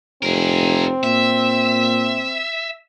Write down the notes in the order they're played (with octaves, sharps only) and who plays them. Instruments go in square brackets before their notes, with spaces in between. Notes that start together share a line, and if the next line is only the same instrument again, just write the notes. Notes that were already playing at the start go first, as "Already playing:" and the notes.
[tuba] F1 [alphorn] C4 [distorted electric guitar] G#4 A#4
[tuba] A#2 [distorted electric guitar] E5